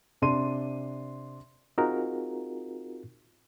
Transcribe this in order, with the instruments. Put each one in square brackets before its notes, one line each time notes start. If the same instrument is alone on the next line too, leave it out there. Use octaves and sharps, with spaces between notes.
[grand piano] C3 D4 C6 D#7
[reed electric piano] C4 D#4 F4 F#4 G#4 A#4